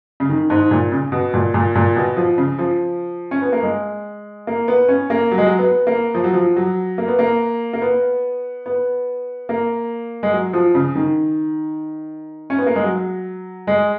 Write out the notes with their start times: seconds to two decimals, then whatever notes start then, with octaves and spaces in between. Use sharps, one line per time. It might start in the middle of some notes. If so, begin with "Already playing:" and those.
0.20 C#3
0.29 D#3
0.50 G#2
0.71 A#2
0.92 C#3
1.12 B2
1.34 A#2
1.54 A#2
1.76 A#2
1.96 B2
2.16 F3
2.38 C#3
2.59 F3
3.31 C#4
3.42 B3
3.53 A#3
3.63 G#3
4.47 A#3
4.68 B3
4.89 C#4
5.10 A#3
5.31 F#3
5.38 G#3
5.46 F#3
5.59 B3
5.87 A#3
6.14 F3
6.24 F#3
6.34 F3
6.56 F#3
6.98 A#3
7.08 B3
7.19 A#3
7.73 A#3
7.82 B3
8.66 B3
9.49 A#3
10.23 G#3
10.33 F#3
10.53 F3
10.75 C#3
10.95 D#3
12.50 C#4
12.58 B3
12.67 A#3
12.76 G#3
12.83 F#3
13.67 G#3